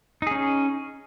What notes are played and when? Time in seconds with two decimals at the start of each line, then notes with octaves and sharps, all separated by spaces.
0.22 D#4
0.27 G#4
0.31 C#4